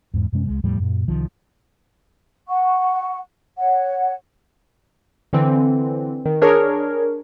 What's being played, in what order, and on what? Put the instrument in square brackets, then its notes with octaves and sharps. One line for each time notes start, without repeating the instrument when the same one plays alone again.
[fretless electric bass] E2 G#2
F#2 C3 G#3 C#4
C#2 G#3
E2 A2 F3 G3
F#2 A#2
C2 D#3 F3
[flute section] F#5 C#6
C#5 F#5
[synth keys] D3 E3 C4
D#3
D4 G#4 A#4 C#5